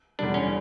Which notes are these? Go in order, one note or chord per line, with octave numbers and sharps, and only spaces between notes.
E2 D3 G3 D4
C#4